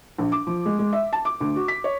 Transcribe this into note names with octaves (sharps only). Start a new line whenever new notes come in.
A#1
D6
F3
G#3
G#3
E5
A5
D6
D2
F#4
B6
C#5